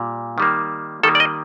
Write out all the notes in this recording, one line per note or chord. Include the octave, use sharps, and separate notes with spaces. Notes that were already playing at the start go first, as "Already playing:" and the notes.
Already playing: A#2 G3
D#3 G3 A#3
D#3 G3 A#3 A4
D5
D#5